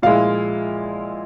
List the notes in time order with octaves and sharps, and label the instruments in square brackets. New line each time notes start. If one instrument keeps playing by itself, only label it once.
[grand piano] A#2 F3 G#3 E4 F5